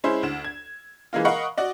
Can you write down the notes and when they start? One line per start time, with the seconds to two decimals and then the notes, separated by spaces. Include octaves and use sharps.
0.04 G#3 C#4 E4 C5
0.23 D2 E7
0.44 G#6
1.13 E3 G#3 A#3 F4
1.25 A#4 D#5 F5 F#5 B5 C#6
1.57 F#4 D5 D#5